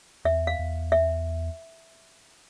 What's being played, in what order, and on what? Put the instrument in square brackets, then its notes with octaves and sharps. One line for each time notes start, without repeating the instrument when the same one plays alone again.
[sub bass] E2 [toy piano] E5
[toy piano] F5
[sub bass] E2
[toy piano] E5